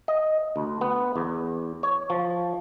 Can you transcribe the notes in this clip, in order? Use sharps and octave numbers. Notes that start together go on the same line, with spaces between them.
D#5
D2
B3
E2
C#5
F3